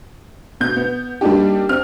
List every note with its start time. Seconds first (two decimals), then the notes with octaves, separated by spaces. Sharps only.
0.60 B2 G6
0.76 B3
1.21 G3 A#3 D4 D#4 G4
1.69 C4 F6